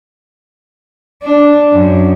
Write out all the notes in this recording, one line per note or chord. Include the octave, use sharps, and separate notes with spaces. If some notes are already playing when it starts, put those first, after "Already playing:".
D4
F#2